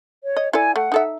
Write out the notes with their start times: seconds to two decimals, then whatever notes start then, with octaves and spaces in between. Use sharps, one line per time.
0.24 C#5
0.37 D#5
0.53 E4 A4 D5 G#5
0.76 A3 F#5
0.92 D#4 A4 E5